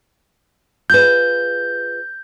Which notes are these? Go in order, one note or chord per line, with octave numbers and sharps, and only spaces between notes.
F4 G#4 B4 G6